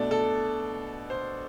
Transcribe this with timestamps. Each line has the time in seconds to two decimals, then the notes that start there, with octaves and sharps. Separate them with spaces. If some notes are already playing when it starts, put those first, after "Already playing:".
Already playing: B2 A3 D4 D5
0.11 A4
1.10 C5